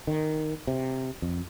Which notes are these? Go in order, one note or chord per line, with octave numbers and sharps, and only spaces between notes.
D#3
C3
F2